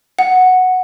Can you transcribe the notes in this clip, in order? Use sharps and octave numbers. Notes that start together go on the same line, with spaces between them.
F#5